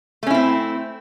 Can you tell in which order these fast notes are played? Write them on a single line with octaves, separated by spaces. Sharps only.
A3 C#4 E4 C4